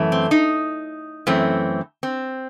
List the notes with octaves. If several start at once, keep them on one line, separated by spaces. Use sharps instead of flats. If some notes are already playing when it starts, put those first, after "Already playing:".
Already playing: F#2 E3 A3
C4
D#4
F#2 E3 A3 C4
C4